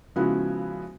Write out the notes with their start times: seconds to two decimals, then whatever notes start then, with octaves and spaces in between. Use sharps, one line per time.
0.16 C#3 F3 G#3 B3 E4 F#4